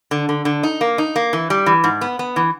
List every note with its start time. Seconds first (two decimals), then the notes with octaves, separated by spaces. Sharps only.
0.11 D3
0.29 D3
0.45 D3
0.63 D#4
0.81 A#3
0.98 D#4
1.16 A#3
1.33 E3
1.50 G3
1.66 E3
1.84 G#2
2.01 B3
2.19 B3
2.36 E3